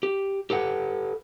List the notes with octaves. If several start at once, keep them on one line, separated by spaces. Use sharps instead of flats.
G4
G4 A4 B4 F#5